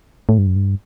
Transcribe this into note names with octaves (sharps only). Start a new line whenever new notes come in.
A2
G2
F#2
G2